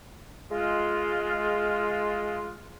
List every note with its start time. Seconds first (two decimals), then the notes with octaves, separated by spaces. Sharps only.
0.51 G#3 F4